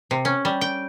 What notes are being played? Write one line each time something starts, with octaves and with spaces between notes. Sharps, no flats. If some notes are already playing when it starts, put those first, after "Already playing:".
C3
C#4
G3
G5